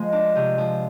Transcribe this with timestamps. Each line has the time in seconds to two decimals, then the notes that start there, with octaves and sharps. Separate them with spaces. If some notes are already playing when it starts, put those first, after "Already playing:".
Already playing: F3 G#3
0.12 D4
0.36 C3
0.58 F3